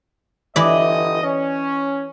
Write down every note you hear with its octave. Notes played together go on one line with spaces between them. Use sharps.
G1 E3 D5 D#5
C#4